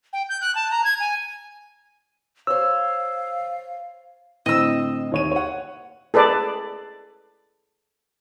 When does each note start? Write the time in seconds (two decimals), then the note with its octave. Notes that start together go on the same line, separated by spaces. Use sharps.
0.13 G5
0.29 G6
0.41 F#6
0.55 A5
0.71 A#5
0.84 G#6
1.00 G#5
2.47 C5 C#5 F5 E6
4.46 A2 D3 C4 D#5 E6
5.12 D#2 C#5 D#7
5.32 C#5 F#5
6.14 G#4 A4 B4 D5